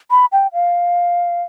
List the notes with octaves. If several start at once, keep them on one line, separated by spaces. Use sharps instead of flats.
B5
G5
F5